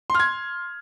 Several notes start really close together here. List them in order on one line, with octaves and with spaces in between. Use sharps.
C6 F6 G#6